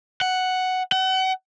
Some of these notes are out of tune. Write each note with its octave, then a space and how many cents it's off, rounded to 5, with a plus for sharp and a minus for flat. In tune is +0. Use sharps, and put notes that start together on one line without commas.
F#5 +5
F#5 +35